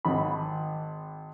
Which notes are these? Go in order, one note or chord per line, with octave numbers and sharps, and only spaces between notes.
G#1 B5